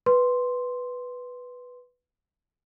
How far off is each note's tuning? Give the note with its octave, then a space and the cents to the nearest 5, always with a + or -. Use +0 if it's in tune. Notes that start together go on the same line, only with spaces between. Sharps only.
B4 +0 C6 +0